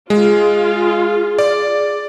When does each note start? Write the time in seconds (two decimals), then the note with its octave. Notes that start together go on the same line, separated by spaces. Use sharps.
0.10 G#3 F4 G#4
1.39 D5